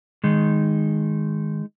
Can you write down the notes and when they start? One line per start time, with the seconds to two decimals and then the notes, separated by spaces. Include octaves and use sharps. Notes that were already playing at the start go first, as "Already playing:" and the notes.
0.24 D#3 G#3 D#4